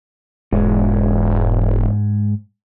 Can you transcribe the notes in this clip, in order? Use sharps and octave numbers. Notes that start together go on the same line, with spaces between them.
E1 G#2 G#3